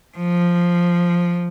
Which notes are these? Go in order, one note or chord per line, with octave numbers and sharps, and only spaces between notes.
F3